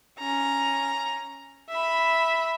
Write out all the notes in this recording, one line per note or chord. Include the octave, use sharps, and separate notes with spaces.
C#4 A#5
E5 B5